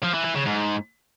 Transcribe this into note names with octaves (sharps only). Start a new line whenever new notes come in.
F3
E3
E3
C#3
G#2